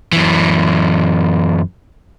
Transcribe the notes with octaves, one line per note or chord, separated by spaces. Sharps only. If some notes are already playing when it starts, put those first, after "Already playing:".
F#2 E3